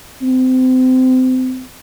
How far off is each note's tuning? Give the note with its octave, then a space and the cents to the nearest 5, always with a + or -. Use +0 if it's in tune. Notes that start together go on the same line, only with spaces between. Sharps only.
C4 -30